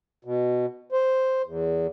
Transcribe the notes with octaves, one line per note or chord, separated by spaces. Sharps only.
B2
C5
E2